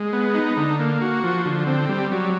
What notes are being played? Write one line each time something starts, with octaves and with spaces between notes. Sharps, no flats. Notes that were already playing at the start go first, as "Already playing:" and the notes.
Already playing: G#3
B3
D#4
D3
A#3
F#4
F3
D3
C4
G3
F#3